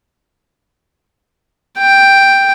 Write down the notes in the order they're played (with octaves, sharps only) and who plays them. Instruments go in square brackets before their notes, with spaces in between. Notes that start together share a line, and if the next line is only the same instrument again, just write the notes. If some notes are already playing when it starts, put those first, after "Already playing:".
[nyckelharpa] G5